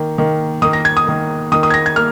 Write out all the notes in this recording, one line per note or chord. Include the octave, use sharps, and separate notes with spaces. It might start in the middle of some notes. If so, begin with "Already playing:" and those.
Already playing: D#3 A#3
D#3 A#3
D#3 A#3 D#6
A#6
G#6
D#6
D#3 A#3
D#3 A#3 D#6
D#6
G#6
A#6
G#6
A#3 F6